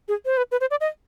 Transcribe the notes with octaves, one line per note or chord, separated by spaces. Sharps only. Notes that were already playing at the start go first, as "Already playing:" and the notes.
G#4
C5
B4
B4
C5
D5
D#5